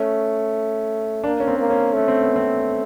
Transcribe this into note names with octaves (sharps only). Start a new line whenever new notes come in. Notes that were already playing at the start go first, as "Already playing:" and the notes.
Already playing: A3 C#4
A#3 D4
C#4
C4
A#3
C#4
A3 C#4
C4
B3
C4